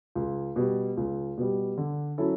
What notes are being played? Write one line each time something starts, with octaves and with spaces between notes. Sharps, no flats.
C#2
B2 G3
C#2
B2 G3
D3
F#3 C#4 E4 A4